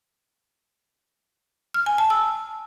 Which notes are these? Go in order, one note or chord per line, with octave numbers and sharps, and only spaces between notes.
F6
G#5
A5
E6